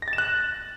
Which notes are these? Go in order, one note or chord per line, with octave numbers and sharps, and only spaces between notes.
A#6
A6
E7
F#6